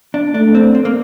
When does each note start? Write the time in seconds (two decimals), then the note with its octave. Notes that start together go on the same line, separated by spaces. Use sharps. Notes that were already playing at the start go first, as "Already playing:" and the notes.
0.14 D4
0.34 A3 D4
0.55 C4
0.75 C4
0.85 A#3